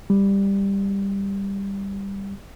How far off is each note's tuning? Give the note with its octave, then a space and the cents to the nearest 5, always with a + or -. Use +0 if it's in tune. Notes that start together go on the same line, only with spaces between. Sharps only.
G3 +10